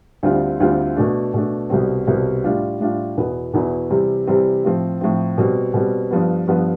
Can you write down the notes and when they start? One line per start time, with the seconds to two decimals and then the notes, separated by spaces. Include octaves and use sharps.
0.23 D2 D3 G3 C4 F4
0.60 D2 D3 G3 C4 F4
0.96 B2 A3 D4
1.34 B2 A3 D4
1.70 C2 B2 G3 C4
2.07 C2 B2 G3 C4
2.44 A2 G3 D4 F4
2.81 A2 G3 D4 F4
3.17 E2 B2 B3 E4
3.54 E2 B2 B3 E4
3.90 C3 E3 G3 C4
4.27 C3 E3 G3 C4
4.64 A2 F3 C4
5.01 A2 F3 C4
5.38 B2 G3 C4
5.74 B2 G3 C4
6.11 G2 F3 B3
6.47 G2 F3 B3